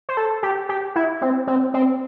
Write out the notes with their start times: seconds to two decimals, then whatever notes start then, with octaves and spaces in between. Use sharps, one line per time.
0.09 C5
0.17 A4
0.43 G4
0.69 G4
0.96 E4
1.22 C4
1.47 C4
1.74 C4